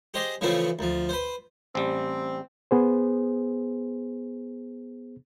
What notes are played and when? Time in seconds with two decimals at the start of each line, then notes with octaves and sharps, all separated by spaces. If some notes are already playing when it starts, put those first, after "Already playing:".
0.14 G4 G#4 C5 D#5
0.41 C#3 E3 F3 A3 C4 C#4
0.79 D2 F3
1.09 B4 C5
1.75 A1 G3 C4
2.71 B3 G#4 C5